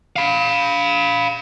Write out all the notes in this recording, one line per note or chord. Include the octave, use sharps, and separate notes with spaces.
F5 B5